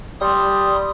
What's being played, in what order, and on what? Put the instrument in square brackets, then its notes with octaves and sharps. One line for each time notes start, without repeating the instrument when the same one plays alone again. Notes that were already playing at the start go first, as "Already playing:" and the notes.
[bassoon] G3 [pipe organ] C6 D#6